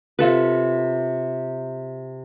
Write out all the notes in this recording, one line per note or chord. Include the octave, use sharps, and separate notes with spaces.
C3 F4 A4 B4